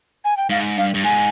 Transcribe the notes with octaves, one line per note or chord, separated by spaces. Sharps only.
G#5
G5
G#2 F5
G2 F5
G2
G#2 G#5